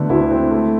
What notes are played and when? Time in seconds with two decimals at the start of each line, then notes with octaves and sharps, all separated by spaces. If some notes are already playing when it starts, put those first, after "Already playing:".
Already playing: D3 A3 B3
0.09 D2 E4
0.31 C4
0.51 A3